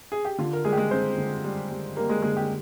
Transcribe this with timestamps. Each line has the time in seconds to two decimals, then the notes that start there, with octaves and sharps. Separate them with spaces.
0.12 G#4
0.25 G4
0.38 D3 F4
0.53 A#4
0.65 G3 G#3 G#4
0.73 G4
0.78 G#3 G#4
0.91 D3 C4 C5
1.18 D3
1.44 G3
1.70 G3
1.96 G3 A#3 A#4
2.09 G#3 G#4
2.22 D3 G#3 G#4
2.37 G4